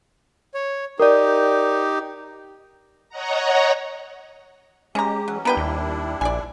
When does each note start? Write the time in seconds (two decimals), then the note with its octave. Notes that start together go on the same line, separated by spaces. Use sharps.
0.54 C#5
1.00 D#4 G4 A#4 D5
3.09 C#5 D#5 F#5 A#5
4.95 G#3 C#4 G4 A#5
5.28 E3 F#3 C#4
5.45 G3 B3 D4 E4 A#4 B4 G5
5.57 D#2
6.21 A#1 D5 G#5